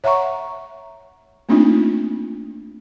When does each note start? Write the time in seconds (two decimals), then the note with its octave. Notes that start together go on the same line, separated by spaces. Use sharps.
0.04 C#5 E5 F#5 A#5 C#6
1.49 A3 A#3 C4 D4 D#4 F4